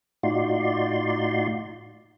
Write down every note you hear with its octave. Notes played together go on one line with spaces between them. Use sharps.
A2 D#4 F4 F#4 D5 C6